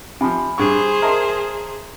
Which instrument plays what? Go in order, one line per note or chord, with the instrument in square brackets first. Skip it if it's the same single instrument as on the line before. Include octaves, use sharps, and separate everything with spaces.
[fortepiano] C3 F3 [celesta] G#5 B5
[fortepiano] G2 C#6 [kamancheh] G#4 C5
[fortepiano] A#4 D#5 [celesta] E5 A5 C6